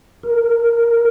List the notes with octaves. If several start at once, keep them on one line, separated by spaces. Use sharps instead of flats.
A#4